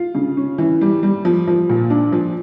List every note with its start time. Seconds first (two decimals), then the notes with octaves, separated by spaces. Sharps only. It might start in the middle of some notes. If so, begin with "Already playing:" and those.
Already playing: F4
0.15 C#3
0.37 C#4
0.58 E3
0.81 G3
1.03 G3
1.25 F3
1.47 F3
1.69 A#2
1.90 D4
2.12 F3